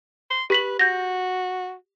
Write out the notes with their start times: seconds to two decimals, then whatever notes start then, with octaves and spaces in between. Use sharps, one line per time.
0.31 C6
0.50 G4 B4 B6 F#7
0.79 F#4 G6 A#6